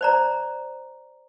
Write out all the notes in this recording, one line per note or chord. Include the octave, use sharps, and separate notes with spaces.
C5 D5 A#5